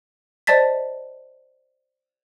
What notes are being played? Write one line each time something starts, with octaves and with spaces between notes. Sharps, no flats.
C5 D5 D#5 A5 A6 B6